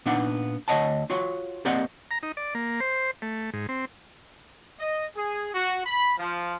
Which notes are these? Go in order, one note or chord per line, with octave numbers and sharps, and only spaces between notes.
A#2 B3 D4 D#4 F#5
D2 E3 C#5 D#5 F#5 A5
F4 F#4 C#5
A#3 C4 G4 D5 D#5 F#5
A#5
D#4
D5
A#3
C5
A3
G#2
C4
D#5
G#4
F#4
B5
F3